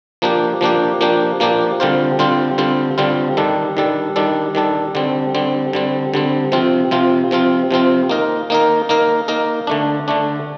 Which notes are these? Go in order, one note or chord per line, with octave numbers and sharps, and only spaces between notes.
F3 A#3 D4 G4
F3 A#3 D4 G4
F3 A#3 D4 G4
F3 A#3 D4 G4
D3 G3 C4 F4 C5
D3 G3 C4 F4 C5
D3 G3 C4 F4 C5
D3 G3 C4 F4 C5
D#3 G3 D4 A4
D#3 G3 D4 A4
D#3 G3 D4 A4
D#3 G3 D4 A4
D3 G3 C4
D3 G3 C4
D3 G3 C4
D3 G3 C4
C3 F3 C4 F4
C3 F3 C4 F4
C3 F3 C4 F4
C3 F3 C4 F4
A#3 D#4 A#4
A#3 D#4 A#4
A#3 D#4 A#4
A#3 D#4 A#4
D3 A3 D4
D3 A3 D4